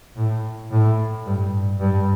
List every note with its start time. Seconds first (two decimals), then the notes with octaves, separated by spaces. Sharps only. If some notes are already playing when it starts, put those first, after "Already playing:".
0.16 A2
0.71 A2
1.26 G2
1.80 G2